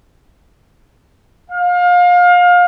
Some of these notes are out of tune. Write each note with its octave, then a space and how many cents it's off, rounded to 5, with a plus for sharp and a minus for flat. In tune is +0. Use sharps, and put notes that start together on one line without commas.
F5 +30